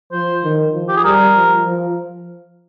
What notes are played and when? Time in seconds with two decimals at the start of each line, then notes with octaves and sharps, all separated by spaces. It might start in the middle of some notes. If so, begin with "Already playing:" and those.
0.12 F3 C5
0.43 D#3
0.73 F3
0.89 G4
0.96 G#4
1.04 G3 A#4
1.35 F3
1.65 F3